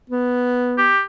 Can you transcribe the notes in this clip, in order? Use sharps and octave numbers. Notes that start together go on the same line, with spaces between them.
B3
G4